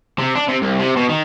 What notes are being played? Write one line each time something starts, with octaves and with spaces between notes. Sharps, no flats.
C3
D4
C3
C2
C3
B2
D#3